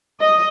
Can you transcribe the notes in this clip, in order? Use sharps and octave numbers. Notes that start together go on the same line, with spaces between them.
D#5